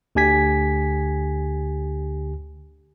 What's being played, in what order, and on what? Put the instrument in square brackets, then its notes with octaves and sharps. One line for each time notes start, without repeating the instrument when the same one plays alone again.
[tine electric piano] D2 D3 G4 G#5 G#6 B6